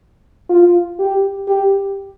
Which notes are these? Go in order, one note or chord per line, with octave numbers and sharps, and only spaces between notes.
F4
G4
G4